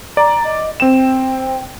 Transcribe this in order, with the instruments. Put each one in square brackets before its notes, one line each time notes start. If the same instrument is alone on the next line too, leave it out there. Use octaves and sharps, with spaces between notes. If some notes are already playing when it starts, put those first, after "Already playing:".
[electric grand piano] D5 [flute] A#5
[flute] D#5
[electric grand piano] C4 E7 [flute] G5